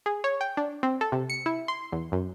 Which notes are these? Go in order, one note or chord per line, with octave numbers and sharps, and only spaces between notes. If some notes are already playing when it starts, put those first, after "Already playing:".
G#4
C#5
G5
D4
C4
A4
C3
C#7
E4
C6
E2
F#2